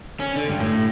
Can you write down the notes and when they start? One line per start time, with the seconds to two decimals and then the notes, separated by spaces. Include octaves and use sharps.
0.20 C#4
0.36 D3
0.49 G2
0.60 A2